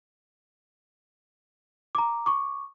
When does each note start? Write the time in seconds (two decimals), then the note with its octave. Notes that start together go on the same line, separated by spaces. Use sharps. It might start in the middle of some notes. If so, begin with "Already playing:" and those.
1.95 A#5 D6
2.26 C#6 D6